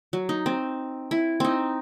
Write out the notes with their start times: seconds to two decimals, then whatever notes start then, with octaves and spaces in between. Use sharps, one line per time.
0.13 F#3
0.29 D#4
0.46 C4
1.11 E4
1.40 C4 D#4